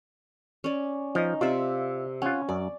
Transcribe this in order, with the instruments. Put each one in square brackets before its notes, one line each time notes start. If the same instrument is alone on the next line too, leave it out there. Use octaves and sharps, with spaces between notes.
[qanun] C#4 D5
[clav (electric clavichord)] F3 [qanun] D#4 D#5
[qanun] C3 D5 E5 [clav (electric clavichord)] F4
[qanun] C#4 [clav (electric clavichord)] F4 F#5
[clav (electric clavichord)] F#2 [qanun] D5